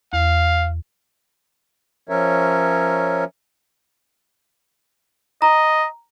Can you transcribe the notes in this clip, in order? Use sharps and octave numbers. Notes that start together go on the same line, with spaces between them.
E2 F5
F3 C#4 A#4 C#5 E5
D#5 A#5